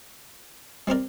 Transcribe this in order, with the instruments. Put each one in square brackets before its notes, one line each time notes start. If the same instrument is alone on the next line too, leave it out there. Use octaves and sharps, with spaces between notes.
[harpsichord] G3 C4 G4 A#4 D5